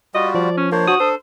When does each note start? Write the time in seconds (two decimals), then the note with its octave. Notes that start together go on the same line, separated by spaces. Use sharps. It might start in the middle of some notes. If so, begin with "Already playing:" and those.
0.14 G3 F4 F#4 D#5
0.35 F3 D5
0.57 C#4
0.72 A#3 D4 C5 C#5
0.88 F#4 D#6
1.00 D4 A4 C5